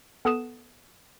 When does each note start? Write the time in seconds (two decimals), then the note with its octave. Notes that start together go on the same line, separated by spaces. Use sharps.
0.25 B3 A4 F#5 D#6 E7